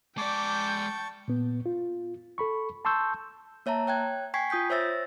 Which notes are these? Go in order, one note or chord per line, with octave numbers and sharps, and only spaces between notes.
G#3 D5 G5 A5 C#6 D6 G6
A#2 B3
F4
A4 B5 C#6
A5 C6 C#6 E6 G6
A#3 C#5 E5 A5 A#5
C#5 G5 F#6 G#6
G5 G#5 C#6 G#6 B6 C7
F4 D#6 G6 B6
C5 C#5 E5 E6 A6 A#6